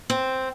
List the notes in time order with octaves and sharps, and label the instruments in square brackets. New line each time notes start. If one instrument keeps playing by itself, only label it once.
[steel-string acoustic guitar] C4